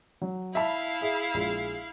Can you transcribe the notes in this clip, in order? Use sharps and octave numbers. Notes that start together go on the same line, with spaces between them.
F#3
E4 E5 F5 A5 B5
G#4 E5
A#1 G#3